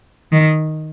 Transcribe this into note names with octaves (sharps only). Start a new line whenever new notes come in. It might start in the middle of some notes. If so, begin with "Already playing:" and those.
D#3